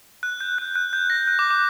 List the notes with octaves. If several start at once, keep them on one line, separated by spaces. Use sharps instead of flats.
F#6
G6
F#6
F#6
G6
A#6
F#6
D6
D6